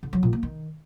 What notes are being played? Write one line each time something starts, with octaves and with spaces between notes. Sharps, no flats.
D3
F#3
A#2
A#3
D#3